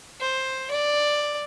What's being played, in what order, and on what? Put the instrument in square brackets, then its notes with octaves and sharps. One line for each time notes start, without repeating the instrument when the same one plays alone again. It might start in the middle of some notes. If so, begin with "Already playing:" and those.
[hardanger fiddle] C5
D5